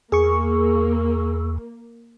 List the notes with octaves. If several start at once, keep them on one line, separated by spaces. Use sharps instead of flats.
E2 A#3 G#4 C#6